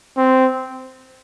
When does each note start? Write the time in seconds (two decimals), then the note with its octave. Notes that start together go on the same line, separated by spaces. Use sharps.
0.17 C4